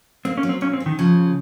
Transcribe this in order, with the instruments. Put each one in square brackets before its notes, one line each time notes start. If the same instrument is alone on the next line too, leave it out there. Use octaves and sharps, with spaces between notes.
[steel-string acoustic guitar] A#3 [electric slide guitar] C4
[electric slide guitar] C#4
[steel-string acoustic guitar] F#3
[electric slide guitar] C4
[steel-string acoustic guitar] A#2 [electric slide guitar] C#4
[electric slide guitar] C4
[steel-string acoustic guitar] C#4
[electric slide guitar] D#3
[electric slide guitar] C#3 [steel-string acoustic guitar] F3